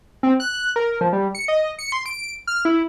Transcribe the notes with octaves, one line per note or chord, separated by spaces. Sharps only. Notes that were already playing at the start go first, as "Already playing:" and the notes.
C4
F#6
A#4
F3
G3
C#7
D#5
C#7
C6
D7
F6
E4